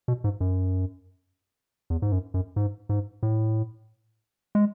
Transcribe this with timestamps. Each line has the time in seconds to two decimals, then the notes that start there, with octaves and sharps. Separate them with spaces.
0.08 B2
0.24 G#2
0.40 F#2
1.90 E2
2.02 G#2
2.12 F#2
2.34 F#2
2.56 G#2
2.89 G#2
3.23 A2
4.55 G#3